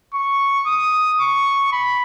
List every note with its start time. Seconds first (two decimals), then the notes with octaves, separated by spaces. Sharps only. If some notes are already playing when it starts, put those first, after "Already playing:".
0.14 C#6
0.67 D#6
1.21 C#6
1.73 B5